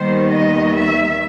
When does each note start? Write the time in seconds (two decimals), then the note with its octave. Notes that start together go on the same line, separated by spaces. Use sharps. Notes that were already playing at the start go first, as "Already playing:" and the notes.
Already playing: D#2 D#3 G3 B3 C5
0.30 D#5
0.74 E5